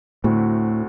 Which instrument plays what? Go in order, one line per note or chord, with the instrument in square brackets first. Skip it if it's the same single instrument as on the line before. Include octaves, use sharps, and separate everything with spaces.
[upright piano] D2 D3 A3 C4 F#4 [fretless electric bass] A2